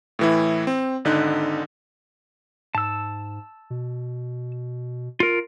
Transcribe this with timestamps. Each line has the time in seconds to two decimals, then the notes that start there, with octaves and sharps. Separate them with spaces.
0.19 A2 E3 E4
0.67 C4
1.05 G#1 D3 D#4 F#6
2.75 G#2 A5 E6
3.70 B2
5.20 F4 A#4